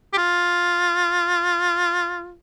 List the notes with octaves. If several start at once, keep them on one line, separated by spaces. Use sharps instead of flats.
G4
F4